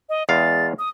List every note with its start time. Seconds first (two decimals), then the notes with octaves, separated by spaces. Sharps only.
0.09 D#5
0.29 E2 G#3 F5 A6
0.79 D#6